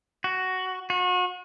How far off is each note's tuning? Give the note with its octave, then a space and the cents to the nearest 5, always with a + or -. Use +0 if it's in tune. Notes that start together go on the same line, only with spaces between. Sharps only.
F#4 +10
F#4 -35